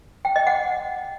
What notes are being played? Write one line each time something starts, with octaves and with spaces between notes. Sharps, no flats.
G5
D#5
F#5